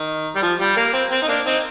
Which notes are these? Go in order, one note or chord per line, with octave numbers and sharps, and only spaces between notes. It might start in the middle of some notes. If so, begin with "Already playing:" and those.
Already playing: D#3
G3
F3
G3
A#3
C4
C4
D#4
A#3 D4
C4 D#4